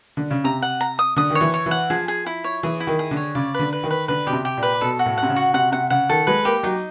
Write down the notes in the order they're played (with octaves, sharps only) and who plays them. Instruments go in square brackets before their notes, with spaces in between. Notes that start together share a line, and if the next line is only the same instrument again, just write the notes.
[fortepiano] D3
C#3
[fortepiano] C3 [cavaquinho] A#5
[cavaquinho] F#5
A#5
D#6
[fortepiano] D3 [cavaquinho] D#6
[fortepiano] D#3 [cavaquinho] C#5
[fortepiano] E3
[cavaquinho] C#5
[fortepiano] E3
[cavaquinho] F#5
[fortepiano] F3 [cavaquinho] G#4
[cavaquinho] G#4
E4
C#5
[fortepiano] E3 [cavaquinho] G#4
[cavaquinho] E4
[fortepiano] D#3
[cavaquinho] G#4
[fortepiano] D3
[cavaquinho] C#5
[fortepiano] C#3 [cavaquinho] D5
[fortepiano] D3 [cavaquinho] B4
[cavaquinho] B4
[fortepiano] D#3
[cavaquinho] B4
[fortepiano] D3 [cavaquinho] B4
[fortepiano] B2 [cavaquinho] G4
[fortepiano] C3
[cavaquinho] G4
[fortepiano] A#2
[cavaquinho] B4
[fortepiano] B2 [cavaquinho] A4
[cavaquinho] F#4
[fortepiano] A2
[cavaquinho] F#5
[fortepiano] C3
C#3
[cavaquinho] F#4
[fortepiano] C3 [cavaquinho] F#5
[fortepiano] C3 [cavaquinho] F#5
[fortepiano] C#3 [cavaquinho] F#5
[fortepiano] D#3 [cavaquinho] A4
[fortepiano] G#3 [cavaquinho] B4
[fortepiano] A#3 [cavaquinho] G4
[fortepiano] F#3 [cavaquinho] D#4